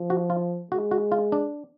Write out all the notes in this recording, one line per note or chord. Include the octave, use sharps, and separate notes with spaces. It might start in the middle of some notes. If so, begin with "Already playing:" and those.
Already playing: F3
F#4
F4
G#3 F#4
F#4
F4
D4